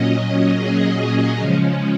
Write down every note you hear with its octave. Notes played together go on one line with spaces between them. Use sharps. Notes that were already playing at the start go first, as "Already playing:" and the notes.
Already playing: A#2 F#3 C#4 D#5
G#4
C#3 F3 G#3 C#4